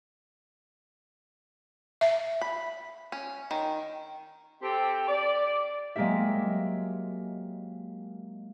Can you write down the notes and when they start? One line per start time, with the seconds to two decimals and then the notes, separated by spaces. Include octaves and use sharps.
2.01 E5
2.41 B5
3.12 C#4
3.51 D#3
4.62 C4 G4 A4
5.08 D5
5.96 F#3 G#3 A#3 C4 G4 E5